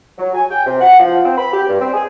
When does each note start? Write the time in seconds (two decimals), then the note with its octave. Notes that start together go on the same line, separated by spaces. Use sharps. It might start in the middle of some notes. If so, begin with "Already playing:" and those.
0.18 F#3
0.35 G#5
0.50 G5
0.66 C3
0.81 F#5
0.99 F3
1.25 C4
1.37 B5
1.53 G4
1.69 G2
1.80 C4
1.93 G#4